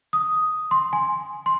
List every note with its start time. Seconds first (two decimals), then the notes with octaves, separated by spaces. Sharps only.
0.13 D#6
0.71 C6
0.93 G#5
1.46 C6